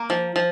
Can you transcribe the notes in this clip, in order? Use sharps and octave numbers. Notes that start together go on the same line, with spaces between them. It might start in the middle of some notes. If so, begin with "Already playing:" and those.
Already playing: A#3
F3
F3